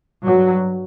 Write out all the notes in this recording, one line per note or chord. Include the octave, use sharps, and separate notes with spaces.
G2 F#3